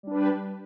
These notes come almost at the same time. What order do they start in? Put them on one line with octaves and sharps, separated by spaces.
G3 D4 B4 G4